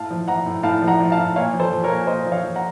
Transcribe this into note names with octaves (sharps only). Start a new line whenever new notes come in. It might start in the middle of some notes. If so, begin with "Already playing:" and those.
Already playing: A2 F5 A5
F3
F3 F#5 A#5
A2
A2 F5 A5
F3
F#5 A#5
F3
F5 A5
A2
A#2 C#5 F5
F3
A4 C5
F3
A#4 C#5
A#2
A#2 C5 D#5
F3
C#5 F5
F3
F#5 A#5